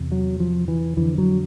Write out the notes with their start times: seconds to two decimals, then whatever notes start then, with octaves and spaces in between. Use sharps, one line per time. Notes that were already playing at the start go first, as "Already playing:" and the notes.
Already playing: E2 C3
0.12 F#3
0.40 F3
0.68 E3
0.97 F2 D3 E3
1.18 F#3